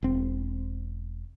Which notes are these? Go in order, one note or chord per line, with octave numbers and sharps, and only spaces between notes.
E1 C4